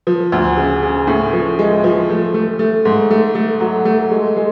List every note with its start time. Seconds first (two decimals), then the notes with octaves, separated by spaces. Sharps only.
0.07 F3
0.32 D2
0.57 C#3
0.83 C#3
1.07 A2
1.33 F3
1.59 G#3
1.84 F3
2.09 A3
2.34 A3
2.59 A3
2.85 G#2
3.11 A3
3.35 A3
3.60 F#3
3.85 A3
4.11 G#3
4.37 G#3